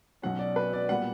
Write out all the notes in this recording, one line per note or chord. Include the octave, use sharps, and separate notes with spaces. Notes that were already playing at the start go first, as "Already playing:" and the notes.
B1 B2 F#3 C#4 F#5
D5
B4
D5
A#2 G3 B3 F#5